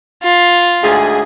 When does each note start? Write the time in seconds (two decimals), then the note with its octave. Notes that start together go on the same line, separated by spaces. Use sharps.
0.23 F4
0.83 D2 G#2 G#4